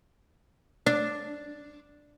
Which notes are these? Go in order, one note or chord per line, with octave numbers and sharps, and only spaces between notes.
D4